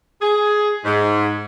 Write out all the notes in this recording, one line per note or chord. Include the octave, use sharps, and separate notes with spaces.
G#4
G#2